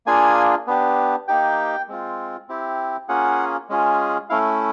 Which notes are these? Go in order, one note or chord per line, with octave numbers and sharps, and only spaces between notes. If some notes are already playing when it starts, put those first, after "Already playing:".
A#3 D4 F4 G#4 G#5
B3 D4 G4
A#3 D#4 G4 G5
G#3 C4 F4
C4 E4 G4
A#3 C#4 F4 G#4 F#5
G#3 C#4 F4 G#4
A3 C#4 E4 F5